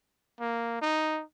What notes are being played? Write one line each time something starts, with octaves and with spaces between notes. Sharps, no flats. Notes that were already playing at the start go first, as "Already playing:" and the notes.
A#3
D#4